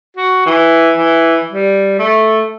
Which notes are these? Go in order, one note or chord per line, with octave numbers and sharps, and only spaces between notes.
F#4
E3
E3
G3
A3